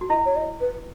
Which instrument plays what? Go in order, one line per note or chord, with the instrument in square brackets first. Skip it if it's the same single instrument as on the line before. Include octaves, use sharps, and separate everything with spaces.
[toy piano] F#4
[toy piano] E4 [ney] D#5
[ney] C#5
D#5
B4